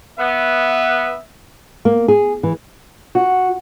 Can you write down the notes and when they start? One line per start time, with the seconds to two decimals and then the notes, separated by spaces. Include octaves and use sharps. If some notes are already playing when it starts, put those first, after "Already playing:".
0.19 B3 E5
1.85 A#3
2.08 G#4
2.43 E3
3.15 F#4